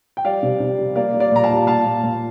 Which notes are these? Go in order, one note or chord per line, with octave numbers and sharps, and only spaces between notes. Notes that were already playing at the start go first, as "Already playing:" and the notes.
G5
G3 D5 F5
C3
C3
G3
A#3 D5 F5
G3
D5 F5
A#2 A#5
F5 A5
G3
A#2 F5 A5
A#2
A#2